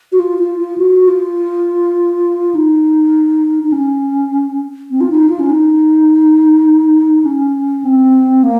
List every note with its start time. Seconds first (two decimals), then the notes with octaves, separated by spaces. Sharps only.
0.12 F#4
0.19 F4
0.39 F4
0.59 F4
0.78 F#4
1.08 F4
2.55 D#4
3.63 D#4
3.72 C#4
4.91 C4
5.01 F4
5.10 D#4
5.29 F4
5.39 C#4
5.50 D#4
7.25 C#4
7.84 C4
8.43 A#3